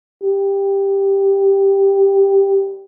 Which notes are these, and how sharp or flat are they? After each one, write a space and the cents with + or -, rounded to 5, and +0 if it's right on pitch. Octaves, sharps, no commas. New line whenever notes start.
G4 +5